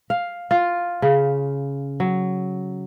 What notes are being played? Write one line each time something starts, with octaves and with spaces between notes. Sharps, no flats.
F5
F4
C#3
F#3